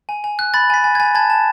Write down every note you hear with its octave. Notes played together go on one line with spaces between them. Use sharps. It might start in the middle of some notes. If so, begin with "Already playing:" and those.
G#5
G#5
F#6
B5 A6
G#5 B6
G#5
G#6
G#5
A5 G#6
A5